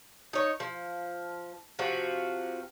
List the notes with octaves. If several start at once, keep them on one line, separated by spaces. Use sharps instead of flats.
D#4 C#5
F3
C3 F3 F#4